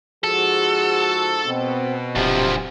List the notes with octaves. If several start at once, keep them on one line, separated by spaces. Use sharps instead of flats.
G#2 F3 F#4 G#4 A4
B2 C4
D1 D2 C3 F3